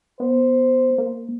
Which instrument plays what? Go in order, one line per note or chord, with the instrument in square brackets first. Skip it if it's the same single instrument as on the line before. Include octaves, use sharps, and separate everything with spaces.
[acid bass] B3 [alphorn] C5
[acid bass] A#3